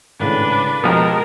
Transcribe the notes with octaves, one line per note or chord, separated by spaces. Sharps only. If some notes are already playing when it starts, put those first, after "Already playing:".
G#1 A2 C#3 D4 B4
F2 B2 F3 G#3 G4 A#4